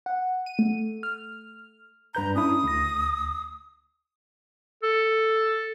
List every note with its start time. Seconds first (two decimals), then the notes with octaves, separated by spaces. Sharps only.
0.06 F#5
0.46 D#7
0.59 A3
1.03 F6
2.15 G2 B4 A#5 G6
2.35 C#4 D4 E4 D#6
2.63 D2 A#6
4.83 A4